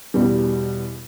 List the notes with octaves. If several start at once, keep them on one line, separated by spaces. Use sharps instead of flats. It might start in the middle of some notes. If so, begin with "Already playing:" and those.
E2 B2 G3